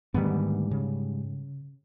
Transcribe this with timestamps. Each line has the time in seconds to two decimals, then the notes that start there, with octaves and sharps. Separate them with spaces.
0.14 D2 G#2 D#3 G3 B3
0.71 C#3